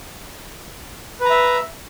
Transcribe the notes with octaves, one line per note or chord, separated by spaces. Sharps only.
B4 E5 A#5